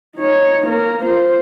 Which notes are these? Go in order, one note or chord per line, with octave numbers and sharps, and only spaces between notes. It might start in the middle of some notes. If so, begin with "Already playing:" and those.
D#4 C#5
A#3 A#4
F4 C5